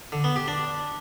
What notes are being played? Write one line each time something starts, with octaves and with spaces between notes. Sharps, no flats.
D3
B3
G4
D4